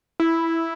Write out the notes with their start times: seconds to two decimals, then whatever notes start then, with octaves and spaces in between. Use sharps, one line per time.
0.20 E4